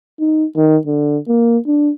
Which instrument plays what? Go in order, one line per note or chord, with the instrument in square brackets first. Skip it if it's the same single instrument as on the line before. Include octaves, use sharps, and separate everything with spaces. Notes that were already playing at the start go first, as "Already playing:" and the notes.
[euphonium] D#4
D#3
D3
A#3
D4